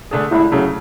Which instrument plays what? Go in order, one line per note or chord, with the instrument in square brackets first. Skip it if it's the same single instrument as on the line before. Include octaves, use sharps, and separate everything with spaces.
[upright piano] D3 A3 D4 G#4
[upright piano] C#2 [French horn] E4
[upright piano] C#3 F#3 A3